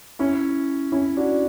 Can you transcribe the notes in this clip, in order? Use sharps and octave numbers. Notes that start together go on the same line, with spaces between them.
C#4 E4
C#4 E4
D4 F#4